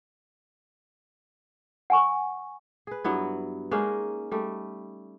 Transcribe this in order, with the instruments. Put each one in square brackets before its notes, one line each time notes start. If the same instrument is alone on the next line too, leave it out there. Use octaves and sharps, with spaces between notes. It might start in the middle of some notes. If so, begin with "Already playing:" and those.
[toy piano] F#5 G#5 C#6
[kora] G#4 B4
G2 F#3 B3 E4
G#3 A#3 C#4 D#4
G3 A3